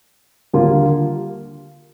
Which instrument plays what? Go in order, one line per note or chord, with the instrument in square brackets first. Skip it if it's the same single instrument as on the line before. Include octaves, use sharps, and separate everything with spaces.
[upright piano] D#2 D3 G3 A#3 F4